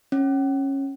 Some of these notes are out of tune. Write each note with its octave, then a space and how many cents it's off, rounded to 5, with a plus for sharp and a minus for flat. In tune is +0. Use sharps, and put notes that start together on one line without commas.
C#4 -20